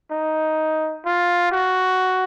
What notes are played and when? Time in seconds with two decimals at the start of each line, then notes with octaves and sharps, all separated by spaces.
0.11 D#4
1.05 F4
1.51 F#4